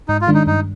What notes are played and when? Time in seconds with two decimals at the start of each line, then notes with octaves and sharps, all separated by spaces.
0.08 G#2 D#4
0.21 F4
0.27 D#3 G#3 D4
0.34 D#4
0.47 G2 D#4